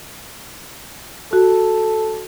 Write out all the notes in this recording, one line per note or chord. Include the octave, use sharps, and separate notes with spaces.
F#4 A4